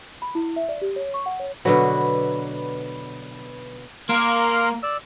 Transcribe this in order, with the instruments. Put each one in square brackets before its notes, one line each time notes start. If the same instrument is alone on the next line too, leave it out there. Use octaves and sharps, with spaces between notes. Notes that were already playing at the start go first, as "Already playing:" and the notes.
[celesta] B5
E4
E5
D5
G4
C#5
C#6
F#5
C#5
[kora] B2 D3 F#3 [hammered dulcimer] B4
[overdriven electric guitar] A#3 [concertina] A#4 F5 C6
[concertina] D5 E6